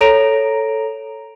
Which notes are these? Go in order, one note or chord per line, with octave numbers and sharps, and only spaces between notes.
A4 C#5 A#5 A#6 D7 F7